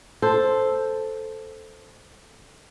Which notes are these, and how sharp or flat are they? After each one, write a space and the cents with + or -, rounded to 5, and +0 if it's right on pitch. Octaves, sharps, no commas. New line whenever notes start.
A4 +0 C5 +0